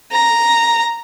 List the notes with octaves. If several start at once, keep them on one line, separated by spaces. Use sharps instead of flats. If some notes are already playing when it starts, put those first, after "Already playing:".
A#5